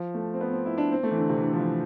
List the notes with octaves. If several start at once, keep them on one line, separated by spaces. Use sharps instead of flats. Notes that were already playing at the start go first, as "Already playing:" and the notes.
Already playing: F3
A3
C4
B3
C4
E4
D4
C4
A3
E3
D3
C3
E3
D3
F3
E3